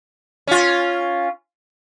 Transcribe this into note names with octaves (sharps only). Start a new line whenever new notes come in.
C#4 F4